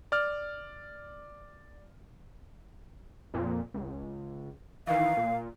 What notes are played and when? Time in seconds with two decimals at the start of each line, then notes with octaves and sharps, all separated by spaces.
0.12 D5 F6
3.34 F2 A#2
3.74 C#2
4.87 D#3 E3 F5
5.17 A#2